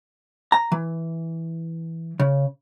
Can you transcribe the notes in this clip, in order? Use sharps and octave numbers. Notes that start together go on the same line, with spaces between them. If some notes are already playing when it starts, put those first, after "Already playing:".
A#5
E3
C#3